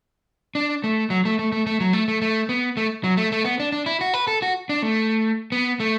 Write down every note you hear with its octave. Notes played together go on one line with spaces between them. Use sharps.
D4
A3
F#3
A3
A3
A3
A3
F#3
A3
A3
A3
B3
A3
F#3
A3
A3
B3
D4
D4
E4
F#4
B4
A4
F#4
D4
A3
B3
A3